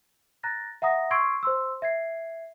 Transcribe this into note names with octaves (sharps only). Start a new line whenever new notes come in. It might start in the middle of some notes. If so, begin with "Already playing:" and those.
A#5 F#6 A6 A#6
E5 F#5 A#5 D#6 A#6
C6 C#6 E6 G#6 C7 D7
C5 C6 E6
E5 G#6 C7